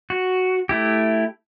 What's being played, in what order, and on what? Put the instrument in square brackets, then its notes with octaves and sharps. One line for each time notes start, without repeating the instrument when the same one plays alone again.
[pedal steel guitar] F#4
A3 E4 G4